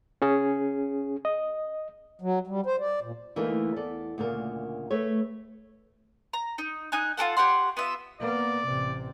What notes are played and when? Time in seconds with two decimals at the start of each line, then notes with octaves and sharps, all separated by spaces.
0.22 C#4 G#4
1.25 D#5
2.22 F#3
2.47 G3
2.66 C5
2.80 D5
3.01 A#2
3.36 D2 E3 A3 A#3 D#4 A#4
3.76 E2 A4 D5
4.18 D2 A#2 C#3 A#4
4.91 A3 B4 C#5
6.33 A#5
6.58 D#4
6.92 D#4 G#5 F#6
7.17 F4 G4 A4 F#5
7.37 G4 C#5 F#5 C6
7.77 B3 F4 E5
8.21 A#3 B3 D5
8.67 A1 C3